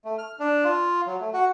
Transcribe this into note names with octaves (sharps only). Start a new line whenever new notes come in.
A3
F6
D4
F4
F#3
A3
F#4